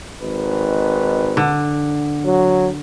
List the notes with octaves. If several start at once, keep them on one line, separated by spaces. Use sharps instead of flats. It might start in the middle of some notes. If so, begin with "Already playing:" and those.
G#1 D#4 B4
D3
F#3